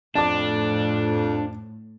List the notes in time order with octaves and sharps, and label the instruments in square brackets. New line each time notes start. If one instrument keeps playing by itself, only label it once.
[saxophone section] F2 [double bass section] A2 [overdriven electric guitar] D4 [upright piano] A5 D6